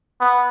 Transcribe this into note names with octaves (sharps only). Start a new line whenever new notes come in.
B3